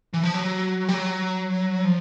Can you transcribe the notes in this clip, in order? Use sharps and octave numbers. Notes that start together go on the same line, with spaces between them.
E3
F3
F#3
G3
F#3
F3